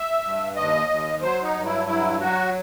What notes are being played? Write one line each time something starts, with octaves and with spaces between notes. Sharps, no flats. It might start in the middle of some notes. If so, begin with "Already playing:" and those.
Already playing: E5
G2
D#2 D#5
D#2
F#3 C5
D#4
G2
E4
F#3 E4
F#3 F#4